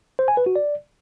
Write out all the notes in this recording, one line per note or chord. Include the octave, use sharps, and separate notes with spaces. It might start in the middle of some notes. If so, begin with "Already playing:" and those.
C5
G#5
B4
F#4
D5